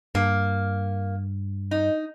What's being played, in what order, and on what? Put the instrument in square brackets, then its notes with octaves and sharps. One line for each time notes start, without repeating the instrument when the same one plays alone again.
[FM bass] G2 [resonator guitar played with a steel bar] A#3
[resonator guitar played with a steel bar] D#4